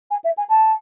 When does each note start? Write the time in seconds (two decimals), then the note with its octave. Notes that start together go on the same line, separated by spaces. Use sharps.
0.10 G#5
0.24 E5
0.37 G#5
0.49 A5